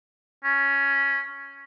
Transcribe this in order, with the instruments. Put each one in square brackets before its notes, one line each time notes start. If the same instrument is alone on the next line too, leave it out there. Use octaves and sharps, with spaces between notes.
[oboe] C#4